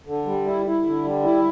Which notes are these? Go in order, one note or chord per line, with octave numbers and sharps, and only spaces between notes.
D3
G3
E4
E4
D3
G3
E4